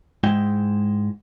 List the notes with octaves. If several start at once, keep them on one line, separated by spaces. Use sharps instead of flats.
G#2 G#3 E4 G5